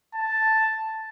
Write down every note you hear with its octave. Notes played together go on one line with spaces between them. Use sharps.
A5